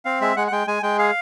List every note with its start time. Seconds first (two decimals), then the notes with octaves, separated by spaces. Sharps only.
0.05 C4 F5
0.21 G#3 E5
0.36 G#3 F#5
0.47 F#5
0.52 G#3 G5
0.67 G#3 G#5
0.83 G#3 G5
0.98 G#4 F5